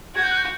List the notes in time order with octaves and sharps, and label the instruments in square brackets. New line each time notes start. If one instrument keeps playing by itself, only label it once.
[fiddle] F#4 [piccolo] G#6
[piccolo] G6
F#6
G6